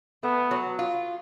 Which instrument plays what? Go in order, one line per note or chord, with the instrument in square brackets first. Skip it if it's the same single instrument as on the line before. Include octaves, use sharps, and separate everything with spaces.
[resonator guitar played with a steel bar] A3 [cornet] B3
[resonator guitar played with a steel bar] F#3
F4